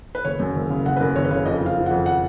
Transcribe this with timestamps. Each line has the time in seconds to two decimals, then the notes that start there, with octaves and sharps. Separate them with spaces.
0.15 B4
0.25 F#1 C#5
0.40 F#2
0.56 F#1
0.70 C#3
0.85 F#1 F#5
0.96 B4
1.01 F#2 A#4
1.16 F#1 C#5
1.25 B4
1.31 C#3 C#5
1.46 F2 D#5
1.61 F3 F5
1.77 F3
1.86 F#5
1.91 F2
2.06 F#5